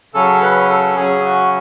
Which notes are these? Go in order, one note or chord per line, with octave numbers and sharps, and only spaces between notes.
C#3 F#3 C#4 A4
B4
A4
C#3 F#3 C#4 G#4
F#4